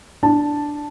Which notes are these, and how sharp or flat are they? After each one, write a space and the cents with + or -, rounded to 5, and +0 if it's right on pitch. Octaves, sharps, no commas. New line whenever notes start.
D4 +0 A5 +0